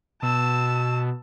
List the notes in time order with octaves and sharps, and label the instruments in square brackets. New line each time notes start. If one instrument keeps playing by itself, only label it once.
[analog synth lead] B2 [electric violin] A5 E6